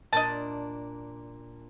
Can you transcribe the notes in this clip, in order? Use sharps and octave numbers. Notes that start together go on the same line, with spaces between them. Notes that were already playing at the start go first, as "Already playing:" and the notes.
A#2 D4 D#5 A5